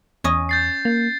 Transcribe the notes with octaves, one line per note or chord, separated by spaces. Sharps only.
E2 C#4 D#5
G6 A6 C7
A#3